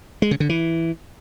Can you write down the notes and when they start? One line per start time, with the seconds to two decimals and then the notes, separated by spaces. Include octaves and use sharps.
0.22 G#3
0.31 C#3
0.40 D3
0.49 E3